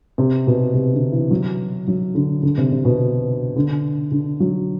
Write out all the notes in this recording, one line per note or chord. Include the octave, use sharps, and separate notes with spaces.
C3
B2
C3
D3
E3
F#3
F#3
D3
D3
C3
C3
B2
D3
D3
F#3